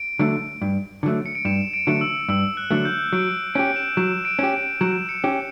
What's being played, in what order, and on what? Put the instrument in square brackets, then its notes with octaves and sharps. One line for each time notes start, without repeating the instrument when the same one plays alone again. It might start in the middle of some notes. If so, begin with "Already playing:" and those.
Already playing: [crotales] D7
[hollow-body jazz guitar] D3 F#3 A3
G2
D3 F#3 A3
[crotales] C#7
D7
[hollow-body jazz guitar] G2 [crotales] E7
[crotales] D7
[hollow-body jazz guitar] D3 F#3 A3
[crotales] E6
[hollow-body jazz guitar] G2 [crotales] E6
[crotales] F#6
[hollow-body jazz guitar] D3 F#3 A3
[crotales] G6
[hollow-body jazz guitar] F#3 [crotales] D7
[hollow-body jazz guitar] C#4 G4 [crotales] D7
[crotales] E7
[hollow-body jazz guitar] F#3 [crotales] E7
[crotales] D7
[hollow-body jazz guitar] C#4 G4
[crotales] D7
[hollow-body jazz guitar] F#3 [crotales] E7
[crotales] C#7
[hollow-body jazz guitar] C#4 G4